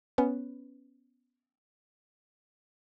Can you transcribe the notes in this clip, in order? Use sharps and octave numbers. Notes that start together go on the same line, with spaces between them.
B3 C#4 B4